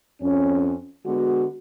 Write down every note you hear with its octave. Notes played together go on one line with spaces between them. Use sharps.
F2 C#4
D3 G#3 B3 F#4